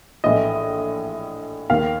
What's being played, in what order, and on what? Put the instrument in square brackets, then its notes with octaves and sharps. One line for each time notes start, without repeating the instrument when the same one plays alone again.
[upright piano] A#1 A2 E3 D#5
D#2 D#3 F5